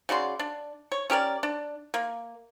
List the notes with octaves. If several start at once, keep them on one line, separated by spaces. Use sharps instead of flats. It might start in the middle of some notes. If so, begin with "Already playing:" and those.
C#3 F#4 D5 C6
D4
C#5
C#4 G4 A#4 D5
D4
A#3